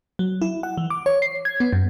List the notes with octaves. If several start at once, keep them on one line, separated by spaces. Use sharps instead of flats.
F#3
E4
F#5
E3
D6
C#5
C7
G#6
B3
F#2